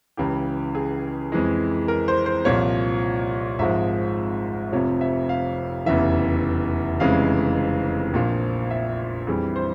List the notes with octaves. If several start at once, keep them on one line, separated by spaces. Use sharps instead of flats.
C#2 C#3 E3 G4
G#4
F2 E3 G#3
A#4
C5
C5
C2 A#2 F3 C#5
G#1 G#2 F3 G#3 E5
F1 F2 C3 F3 C#5
E5
F5
F1 E2 C#3 E3 E5
F1 F2 C#3 E3 G#3 F5
A#1 A#2 F3
E5
F2 E3 G3 G#4
C5